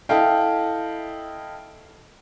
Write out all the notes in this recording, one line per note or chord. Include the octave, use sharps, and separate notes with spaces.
E4 A4 D#5 F5 G5